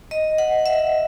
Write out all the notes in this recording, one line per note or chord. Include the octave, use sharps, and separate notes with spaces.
D#5
F#5
E5